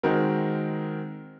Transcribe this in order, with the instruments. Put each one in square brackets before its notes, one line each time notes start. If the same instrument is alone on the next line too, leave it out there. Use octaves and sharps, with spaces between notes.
[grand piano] D#3 G#3 C4 F#4 A#4